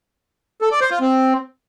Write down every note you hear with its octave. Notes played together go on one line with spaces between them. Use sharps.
A4
D5
C5
F4
C4